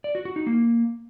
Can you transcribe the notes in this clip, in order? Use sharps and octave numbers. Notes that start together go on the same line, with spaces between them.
D5
F#4
F#4
D#4
A#3